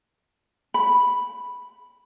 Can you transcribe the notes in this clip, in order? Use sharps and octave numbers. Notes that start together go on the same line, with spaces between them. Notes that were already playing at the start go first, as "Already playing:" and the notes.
B5